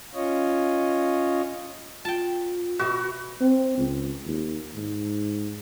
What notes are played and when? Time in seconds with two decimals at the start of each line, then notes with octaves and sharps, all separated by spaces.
0.15 C#4 F4 C#5 D#5
2.05 F4 G5 A5
2.79 B2 F#4 E5
3.41 C4
3.78 C#2
4.26 D#2
4.75 G#2